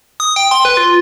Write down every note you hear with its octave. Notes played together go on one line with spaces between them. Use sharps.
D#6
G5
C6
B4
F4